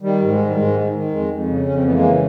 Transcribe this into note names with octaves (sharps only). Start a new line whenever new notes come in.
D#3 G3
G#2
G#3
D#3
G3
G#2 G#3
D#3
D#3
F2 G#3
F2
C#3
F2 C#4
C4
E3 B3
G#3 A#3
C#3